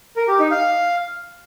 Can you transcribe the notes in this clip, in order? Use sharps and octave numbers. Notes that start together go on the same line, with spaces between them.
A#4
G4
D#4
F5